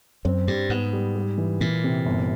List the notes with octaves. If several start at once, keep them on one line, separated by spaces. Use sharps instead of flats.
F#2 C4
G2 G3
G#2 B3
G3
G3
E3
A#2 E3
C3
G1